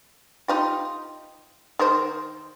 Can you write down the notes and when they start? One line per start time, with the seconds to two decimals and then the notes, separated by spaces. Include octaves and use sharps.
0.48 D#4 F4 G4
1.79 D#3 A#4 C5